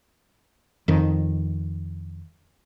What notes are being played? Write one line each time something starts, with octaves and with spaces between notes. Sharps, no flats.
F2 D#3